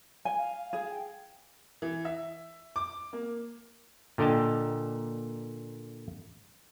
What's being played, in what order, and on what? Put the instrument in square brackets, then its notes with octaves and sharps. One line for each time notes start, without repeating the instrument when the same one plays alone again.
[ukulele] G#5
[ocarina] F5
[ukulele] G#4 [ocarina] F5
[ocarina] G5
[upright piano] E3
E5
D6
A#3
[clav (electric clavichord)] A#2 D3 A#4 D#5 G5 A5